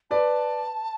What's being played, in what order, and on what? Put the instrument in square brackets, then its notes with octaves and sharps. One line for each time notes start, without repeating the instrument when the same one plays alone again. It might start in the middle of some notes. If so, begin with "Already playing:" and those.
[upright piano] B4 D5 [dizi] A5